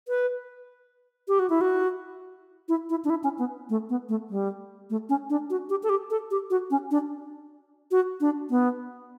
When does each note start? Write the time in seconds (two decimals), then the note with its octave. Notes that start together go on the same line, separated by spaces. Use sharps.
0.08 B4
1.28 G4
1.39 F#4
1.50 E4
1.61 F#4
2.69 E4
2.90 E4
3.05 D4
3.10 E4
3.24 C#4
3.39 B3
3.70 A3
3.89 B3
4.09 A3
4.30 G3
4.90 A3
5.09 C#4
5.30 D4
5.50 F#4
5.70 G4
5.83 A4
5.89 G4
6.10 A4
6.31 G4
6.50 F#4
6.70 C#4
6.91 D4
7.91 F#4
8.21 D4
8.50 B3